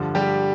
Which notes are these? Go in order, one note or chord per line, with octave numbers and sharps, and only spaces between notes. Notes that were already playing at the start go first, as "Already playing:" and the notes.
Already playing: G2 D3 F3
G3 G4